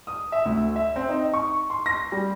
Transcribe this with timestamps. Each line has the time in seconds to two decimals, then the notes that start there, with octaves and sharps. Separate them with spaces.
0.07 D#6
0.32 E5
0.45 D2
0.76 E5
0.96 C4
1.09 D#4
1.33 C#6
1.70 C6
1.86 A#6
2.12 G3